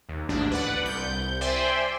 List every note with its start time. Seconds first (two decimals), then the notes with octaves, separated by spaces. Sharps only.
0.09 D#2
0.29 A1 D2 G#2 D4
0.51 B4 D5 F#5
0.83 C2 G6
1.41 C5 D5 E5 G5 G#5 C6